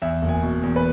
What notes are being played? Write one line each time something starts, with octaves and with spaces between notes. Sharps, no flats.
E2 E5
F#1
G#5
B2
E2
B4